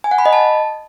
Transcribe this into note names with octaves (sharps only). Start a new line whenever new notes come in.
G#5
F#5
B5
D#5
A5